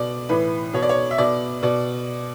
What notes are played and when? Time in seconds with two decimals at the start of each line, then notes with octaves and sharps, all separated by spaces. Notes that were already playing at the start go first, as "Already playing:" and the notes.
Already playing: B2 D5
0.29 A2 E3 B4
0.73 B2 C#5
0.83 D5
0.89 C#5
1.11 E5
1.18 B2 D5
1.62 B2 D5